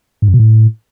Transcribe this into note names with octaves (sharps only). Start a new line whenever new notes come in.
G#2
F#2
B2
A2